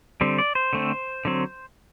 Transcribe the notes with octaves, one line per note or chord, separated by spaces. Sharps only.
D3 G3 C4
D5
C5
D3 A3 C4
D3 F#3 C4